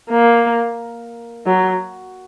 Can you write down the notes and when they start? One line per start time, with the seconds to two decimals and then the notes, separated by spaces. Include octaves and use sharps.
0.10 A#3
1.46 F#3